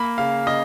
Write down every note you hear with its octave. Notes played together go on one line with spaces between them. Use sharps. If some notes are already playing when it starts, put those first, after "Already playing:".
Already playing: A#3 B5
C#3 F5
C#3 D#5